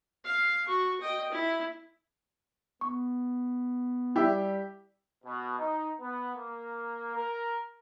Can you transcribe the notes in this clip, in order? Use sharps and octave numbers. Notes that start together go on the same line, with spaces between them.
F5
F#4 C#6
D#5 G5
E4
B3 C#6
G3 E4 G4 E5
B2
D#4
B3
A#3
A#4